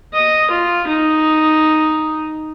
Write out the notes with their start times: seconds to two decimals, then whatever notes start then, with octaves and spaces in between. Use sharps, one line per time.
0.14 D#5
0.51 F4
0.87 D#4